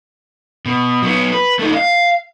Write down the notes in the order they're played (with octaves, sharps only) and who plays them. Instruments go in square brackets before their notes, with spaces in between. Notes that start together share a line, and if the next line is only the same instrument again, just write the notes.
[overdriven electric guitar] B2
F#3 B3
B4
A3 D#4
D#5 F5